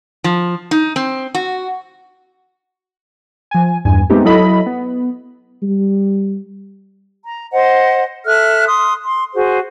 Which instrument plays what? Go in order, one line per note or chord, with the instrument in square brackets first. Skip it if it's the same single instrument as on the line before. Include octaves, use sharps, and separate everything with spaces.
[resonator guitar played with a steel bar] F3
D#4
C4
F#4
[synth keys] F3 G#5
E2 G2 G#5
G#3 A3 B3 C4 D#4 G4
F#3 E4 A4 D#5 B5
B3
[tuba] G3
[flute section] A#5
C5 D#5 F#5
A4 E5 F6 F#6
C6 D#6
C6
F#4 G#4 C5